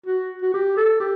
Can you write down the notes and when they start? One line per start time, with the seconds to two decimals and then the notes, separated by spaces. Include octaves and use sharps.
0.06 F#4
0.42 F#4
0.54 G4
0.77 A4
1.00 G4